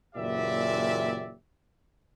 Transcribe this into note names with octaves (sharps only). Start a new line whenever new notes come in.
F#1 A#2 E3 G4 D5 E5